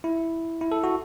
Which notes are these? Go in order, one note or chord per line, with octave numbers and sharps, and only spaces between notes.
E4
E4
A4
F#4